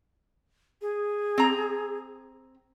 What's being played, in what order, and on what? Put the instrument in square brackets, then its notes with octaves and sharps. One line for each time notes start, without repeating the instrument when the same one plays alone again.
[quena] G#4
[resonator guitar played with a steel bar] C4 A#5